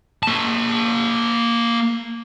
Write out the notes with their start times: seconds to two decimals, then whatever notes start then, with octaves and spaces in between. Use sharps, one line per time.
0.23 A#3 A5